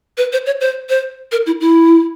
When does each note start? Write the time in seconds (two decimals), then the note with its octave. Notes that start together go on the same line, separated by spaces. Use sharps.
0.18 B4
0.33 C5
0.46 C#5
0.61 C5
0.89 C5
1.32 A#4
1.46 E4
1.61 E4